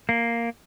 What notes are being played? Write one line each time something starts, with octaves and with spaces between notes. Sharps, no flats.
A#3